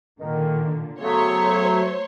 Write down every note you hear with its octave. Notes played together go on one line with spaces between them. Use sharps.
A#2 D3 D#3
C#3 F#3 A3 B3 C5 C#5 C6